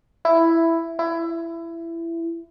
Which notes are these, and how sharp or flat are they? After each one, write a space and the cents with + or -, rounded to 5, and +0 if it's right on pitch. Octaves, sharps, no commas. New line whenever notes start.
E4 +5
E4 +20